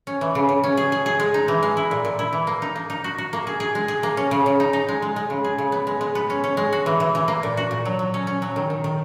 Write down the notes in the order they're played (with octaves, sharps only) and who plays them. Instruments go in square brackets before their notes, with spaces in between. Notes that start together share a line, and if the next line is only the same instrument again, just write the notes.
[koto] C#4
E3
C#3
C#3
C#4
G#4
G#4
G#4
G#3
D#4
E3
G#3
E4
A#2
A#2
E4
E3
A#3
D#4
A#3
D#4
F#4
F#4
A#3
G#4
G#4
G#3
G#4
A#3
C#4
C#3
C#3
D#4
D#4
G#3
G#3
G#3
C#3
G#4
C#3
B3
G#3
G#3
B3
C#4
C#4
G#3
F#4
E3
E3
E3
A#3
A#2
F#4
A#2
F#3
F#3
C#4
C#4
F#3
D#3
D#3
D#3